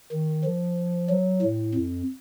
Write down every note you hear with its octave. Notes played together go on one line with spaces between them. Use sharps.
D#3
F3
F#3
A2
F2